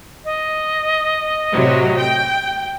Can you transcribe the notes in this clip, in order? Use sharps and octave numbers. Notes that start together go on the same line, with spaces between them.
D#5
A2 C3 F#3
G5